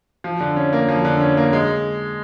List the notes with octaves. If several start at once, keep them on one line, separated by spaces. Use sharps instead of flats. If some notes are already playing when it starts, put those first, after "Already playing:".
F3
D3
C#4
A#3
F3
D3
C#4
A#3
G#3